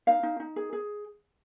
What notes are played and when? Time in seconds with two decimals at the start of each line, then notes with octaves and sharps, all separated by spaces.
0.07 D#4 F5
0.23 D#4
0.40 D#4
0.56 G#4
0.73 G#4